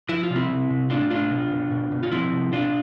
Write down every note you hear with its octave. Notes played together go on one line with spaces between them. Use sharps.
F3 E4
F4
C3
C4 E4
C3
C3
A2 D4 F4
A2 D4 F4
B2
B2
B2
B2
F4
F3 C4 E4
C3
B2 D4 F4